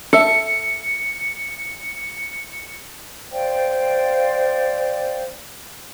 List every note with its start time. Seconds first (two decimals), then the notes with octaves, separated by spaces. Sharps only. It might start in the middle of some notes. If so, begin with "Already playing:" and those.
0.13 A4 E5 C#7
3.31 C5 D5 F5 G5